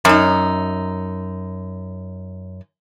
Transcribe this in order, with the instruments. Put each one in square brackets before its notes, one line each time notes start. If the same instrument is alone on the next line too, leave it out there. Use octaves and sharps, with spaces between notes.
[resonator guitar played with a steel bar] F#2 D#4